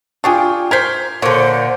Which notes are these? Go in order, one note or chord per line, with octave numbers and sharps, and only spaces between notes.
D4 F4 G4 G#4 G5 C#6
A#4 C5 G#6 B6
A#2 D3 C5 C#5